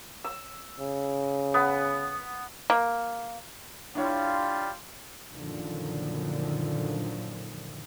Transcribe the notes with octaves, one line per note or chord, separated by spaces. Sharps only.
E6
C#3
B3
A#3
G3 D4 E4 F4 C#5
F#2 A#2 D3 D#3 F3